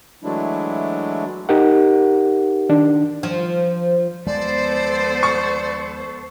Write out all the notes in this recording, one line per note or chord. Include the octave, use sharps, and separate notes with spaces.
E3 F#3 G#3 A3 D4 E4
D#4 G4 A#4 F#5
D#3 D4
F3
D#2 F3 G#3 B3 A4 C5 D5
C#6